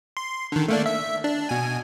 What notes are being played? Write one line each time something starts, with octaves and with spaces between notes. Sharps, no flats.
C6
D3 D#3
A3 A#3 D4
E5
D4
B2 G#5